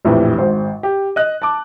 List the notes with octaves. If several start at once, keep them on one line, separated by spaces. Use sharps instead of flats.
A#1 F2 A2 E3 G4 B4
G#1 G#2 C5
G4
D#5 F#6
A5 D6